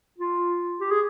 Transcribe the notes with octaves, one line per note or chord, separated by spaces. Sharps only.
F4
G4
G#4